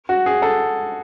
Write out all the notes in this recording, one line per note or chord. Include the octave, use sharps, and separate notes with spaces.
F#4
G#4
A4